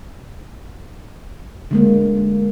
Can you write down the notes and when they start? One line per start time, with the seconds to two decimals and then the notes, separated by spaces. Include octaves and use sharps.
1.71 D3 G#3 A#3